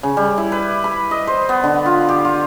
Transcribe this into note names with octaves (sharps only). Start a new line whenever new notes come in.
C#3
G3
E4
B4
B5
D#5
C5
B3
D3
F4
G4
F4